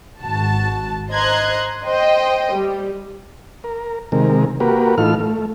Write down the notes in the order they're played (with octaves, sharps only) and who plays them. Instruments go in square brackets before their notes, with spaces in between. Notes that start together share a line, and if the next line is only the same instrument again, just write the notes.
[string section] G#1 F#4 A5
C5 D#5 A#5 C6 F#6 G#6
C5 D#5 G5
G3
[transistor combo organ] A#4
C3 D#3 G#3 A#4
A#3 F#4 G4 A#4 B4
A2 E3 D#4 F4 A4 F6
A3